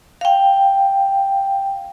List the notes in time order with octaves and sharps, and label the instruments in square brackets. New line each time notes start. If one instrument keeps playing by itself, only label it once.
[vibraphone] F5 G5